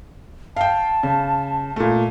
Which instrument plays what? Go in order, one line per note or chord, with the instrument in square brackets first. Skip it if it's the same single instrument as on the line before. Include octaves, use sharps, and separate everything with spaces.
[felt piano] F5 G5 [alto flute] A5
[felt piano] C#3
A#2 A3